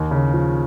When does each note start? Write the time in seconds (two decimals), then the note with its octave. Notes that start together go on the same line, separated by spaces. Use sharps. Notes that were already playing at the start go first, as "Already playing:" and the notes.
Already playing: D#2
0.11 C#3
0.33 F3